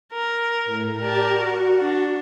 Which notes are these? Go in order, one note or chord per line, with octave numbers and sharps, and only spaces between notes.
A#4
A2
G4 A#4 D5 A5
F#4
D4